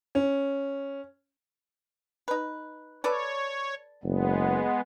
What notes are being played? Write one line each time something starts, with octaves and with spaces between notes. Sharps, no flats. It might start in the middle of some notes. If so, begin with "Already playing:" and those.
C#4
D#4 B4
A4 B4 C#5 D5
F#1 G#3 B3